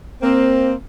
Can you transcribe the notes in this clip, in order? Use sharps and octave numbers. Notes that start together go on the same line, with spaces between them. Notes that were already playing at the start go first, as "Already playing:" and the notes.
A#3 C4